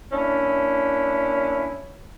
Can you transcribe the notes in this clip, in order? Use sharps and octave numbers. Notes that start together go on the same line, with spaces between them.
A#3 C#4 D4 E4